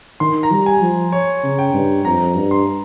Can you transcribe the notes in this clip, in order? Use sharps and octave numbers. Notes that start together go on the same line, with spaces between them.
D#3 C6
A#5
G3
G#5
F3
C#5
C#3
G5
G2
F2 A#5
G2
C6